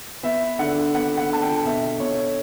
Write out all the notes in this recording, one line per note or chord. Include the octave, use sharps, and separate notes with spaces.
B3 E5
D3 F#5
B3 F#5
F#5
D3 A5
G5
B2 E5
B2 C#5